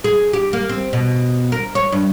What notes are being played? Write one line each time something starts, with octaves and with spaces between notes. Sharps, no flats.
G#4
G4
A#3
C4
B2
A#4
C#5
G2